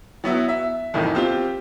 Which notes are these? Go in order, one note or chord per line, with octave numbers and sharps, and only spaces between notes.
F#3 B3 E4
E5
C2 F2 A2 D#3 E3
C4 F4 G4